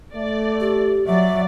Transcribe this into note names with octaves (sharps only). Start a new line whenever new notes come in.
A3 D5
G4
F#3 D5 E5